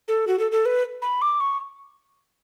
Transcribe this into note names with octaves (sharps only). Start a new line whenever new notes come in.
A4
F#4
A4
A4
B4
B5
D6
C#6